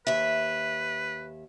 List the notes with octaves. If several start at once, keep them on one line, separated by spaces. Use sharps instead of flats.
D#2 B4 E5